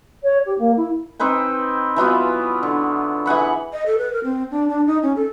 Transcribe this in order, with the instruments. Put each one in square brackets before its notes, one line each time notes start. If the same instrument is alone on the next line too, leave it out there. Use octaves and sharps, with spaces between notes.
[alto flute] C#5
G4
A#3
E4
[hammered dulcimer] C4 D#4 B4 G5
E3 F#3 B3 F4
D3
E3 G#4 F#5 B5
[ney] D#5
A4
B4
A#4
C4
D4
D4
D#4
C#4
A4